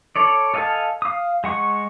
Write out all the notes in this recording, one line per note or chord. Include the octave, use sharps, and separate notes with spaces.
A4 C#5 D5
A4 D#5 F5 G#5 A5
F5 D#6
G#3 F#5 C#6